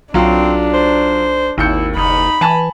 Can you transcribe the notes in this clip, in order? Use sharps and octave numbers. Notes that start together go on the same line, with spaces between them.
B1 F#3 C4 D4 F4
C5
G#1 D#2 E4 G6 C#7
F#1 D#4 B5
E3 G#5 A5